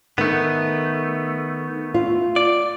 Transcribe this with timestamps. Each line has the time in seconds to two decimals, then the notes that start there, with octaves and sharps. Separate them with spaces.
0.18 D#3 A3 B3
1.94 F4
2.36 D5